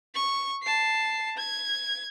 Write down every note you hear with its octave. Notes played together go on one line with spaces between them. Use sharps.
C#6
A5 C7
G#6